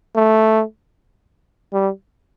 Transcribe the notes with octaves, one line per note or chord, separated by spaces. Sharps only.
A3
G3